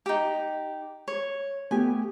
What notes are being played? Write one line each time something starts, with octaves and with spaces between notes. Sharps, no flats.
D#4 G4
C#5
A3 B3 G4 G#5